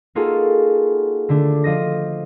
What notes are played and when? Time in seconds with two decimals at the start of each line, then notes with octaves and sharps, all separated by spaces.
0.15 A#3 D#4 F4 F#4 G#4 A4
1.29 D3 A3 D4
1.64 F3 F4 D#5 A#6